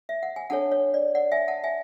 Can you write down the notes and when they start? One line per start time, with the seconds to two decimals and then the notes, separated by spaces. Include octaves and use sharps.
0.09 E5
0.23 F#5
0.36 G#5
0.50 D4 A4 C#5 F#5 A5
0.72 C#5
0.94 D5
1.15 D5 F#5
1.32 E5 G#5
1.48 F#5 A5
1.64 E5 G#5